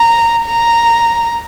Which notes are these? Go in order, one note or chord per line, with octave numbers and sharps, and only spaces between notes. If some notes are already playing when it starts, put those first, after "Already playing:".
Already playing: A#5
A#5